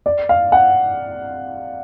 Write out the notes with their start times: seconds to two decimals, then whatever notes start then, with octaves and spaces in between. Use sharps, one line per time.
0.06 D5
0.29 F5
0.52 F#5